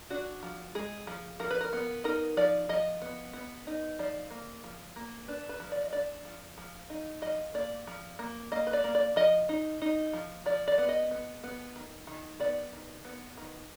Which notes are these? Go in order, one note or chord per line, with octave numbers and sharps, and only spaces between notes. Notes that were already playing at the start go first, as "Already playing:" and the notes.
D4 F#4
F3
G#3 G#4
F3
F3 A#4
B4
A#4
B3
D#4 A#4
F3 D5
F3 D#5
B3
B3
D#4
F3 D5
A#3
F3
A#3
D4 B4
B4
F3
D5
D#5
D4 D5
F3
F3
D#4
F3 D#5
A#3 D5
F3
A#3
A#3 D#5
B4
D5
A#3
D5
F3 D#5
D#4
D#4
F3
F3 D5
D5
B3
D#5
B3
B3
D#3
D#3
B3 D5
D#3
B3
D#3